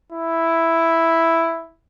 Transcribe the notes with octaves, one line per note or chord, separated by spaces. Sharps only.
E4